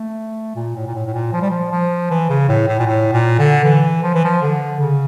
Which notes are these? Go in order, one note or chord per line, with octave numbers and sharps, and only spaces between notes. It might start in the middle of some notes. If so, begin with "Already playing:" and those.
Already playing: A3
A#2
A2
A#2
A2
A2
A#2
F3
G3
F3
F3
E3
C#3
A2
A2
A#2
A2
A#2
D3
E3
F3
E3
F3
D3
C#3